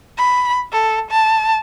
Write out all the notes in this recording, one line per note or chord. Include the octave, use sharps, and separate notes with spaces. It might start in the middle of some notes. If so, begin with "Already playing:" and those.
B5
A4
A5